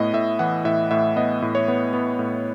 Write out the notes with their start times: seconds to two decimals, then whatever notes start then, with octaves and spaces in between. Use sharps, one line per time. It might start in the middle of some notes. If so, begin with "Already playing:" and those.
Already playing: A2 B3 D#5
0.13 A2 E5
0.39 E3 F#5
0.65 A2 E5
0.91 A2 E5
1.16 B3 D#5
1.42 A2
1.55 C#5
1.68 B3
1.93 B3
2.19 A2